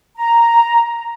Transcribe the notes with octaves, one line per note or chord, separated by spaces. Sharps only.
A#5